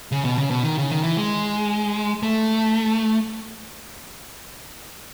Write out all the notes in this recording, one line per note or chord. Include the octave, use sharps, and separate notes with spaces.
C#3
B2
C#3
B2
D#3
C#3
D#3
E3
G#3
A3